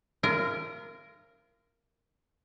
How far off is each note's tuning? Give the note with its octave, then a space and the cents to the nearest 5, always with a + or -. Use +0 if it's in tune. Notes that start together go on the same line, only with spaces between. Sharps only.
F4 -40 A#4 +0